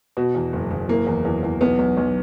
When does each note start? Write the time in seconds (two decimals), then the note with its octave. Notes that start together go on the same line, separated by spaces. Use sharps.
0.17 B2 F#4
0.35 E2
0.53 F#1
0.71 F#1
0.89 E3 A#3
1.07 E2
1.25 E2
1.43 E2
1.61 B1 B3
1.79 B1
1.97 B1